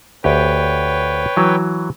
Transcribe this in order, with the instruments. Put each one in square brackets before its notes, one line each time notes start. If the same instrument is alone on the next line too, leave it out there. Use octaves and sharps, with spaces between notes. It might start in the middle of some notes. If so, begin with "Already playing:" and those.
[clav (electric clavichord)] D2 G4 [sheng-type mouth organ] B4 C#5 G5
[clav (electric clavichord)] E3 F#3